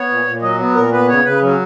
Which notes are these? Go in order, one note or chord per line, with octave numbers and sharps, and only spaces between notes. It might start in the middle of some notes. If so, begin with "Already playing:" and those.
Already playing: B3 C#5
A#2
A#2
F#3 D#5
B3
A#2 A#4
B3 B4
C#3 C#5
C#3 B4
F#3 C#4